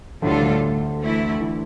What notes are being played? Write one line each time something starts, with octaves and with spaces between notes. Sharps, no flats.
D2 A2 D3 G3 D4 F4 A4
D2 D3
E3 A3 E4
E3